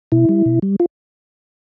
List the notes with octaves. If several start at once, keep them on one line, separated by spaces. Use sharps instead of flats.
B2 E4
G3
B2
G3
F4